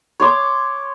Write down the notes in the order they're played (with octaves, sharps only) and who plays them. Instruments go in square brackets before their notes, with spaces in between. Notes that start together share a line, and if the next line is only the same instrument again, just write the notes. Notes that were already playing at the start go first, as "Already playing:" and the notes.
[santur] C#5 C6 D6